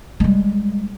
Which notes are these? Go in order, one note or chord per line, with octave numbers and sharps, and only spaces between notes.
G3 G#3